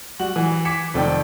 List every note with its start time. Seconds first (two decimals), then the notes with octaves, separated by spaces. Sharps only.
0.19 G3 F#4 F#7
0.36 E3
0.65 D6 G#6 B6 C#7 E7
0.94 F1 F2 D#3 D5 G5